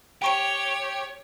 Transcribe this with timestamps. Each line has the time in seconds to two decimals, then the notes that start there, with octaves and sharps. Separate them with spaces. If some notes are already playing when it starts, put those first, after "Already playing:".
0.22 G4 C#5 G5 C#6 D7